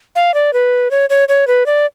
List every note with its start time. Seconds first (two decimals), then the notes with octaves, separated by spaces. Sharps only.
0.16 F5
0.34 D5
0.53 B4
0.91 C#5
1.10 C#5
1.29 C#5
1.47 B4
1.66 D5